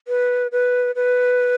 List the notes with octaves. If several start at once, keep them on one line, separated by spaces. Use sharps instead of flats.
B4
B4
B4